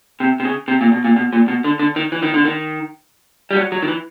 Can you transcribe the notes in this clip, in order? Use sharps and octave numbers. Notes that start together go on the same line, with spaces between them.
C3
C3
C#3
C3
A#2
B2
A#2
B2
A#2
B2
D3
D3
D#3
E3
D#3
D3
D#3
G3
F#3
F#3
D#3
E3